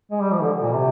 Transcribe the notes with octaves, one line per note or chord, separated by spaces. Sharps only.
G#3
G3
F3
D3
A#2
C3